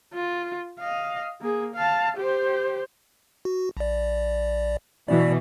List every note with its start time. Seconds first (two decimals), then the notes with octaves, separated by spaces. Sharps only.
0.13 F4
0.79 D#5 F5
1.41 A#3 G#4
1.75 F5 A5
2.17 G4 C5
3.45 F#4
3.77 A#1 D5
5.08 B2 E3 D5